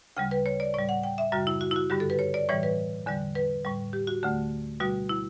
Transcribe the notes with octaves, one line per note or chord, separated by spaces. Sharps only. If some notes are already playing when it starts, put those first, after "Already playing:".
D2 C#3 G3 G5
B4
C#5
D5
A2 G3 D5
F#5
G5
E5
F#2 C#3 G3 F#4
E4
F#4
E4
F#4
G2 D3 G3 G4
A4
B4
C#5
D5
A2 E3 G3 C#5
B4
E2 D3 G3
B4
A2 G3
G4
F#4
D2 D3 A3
B2 G3 F#4
E4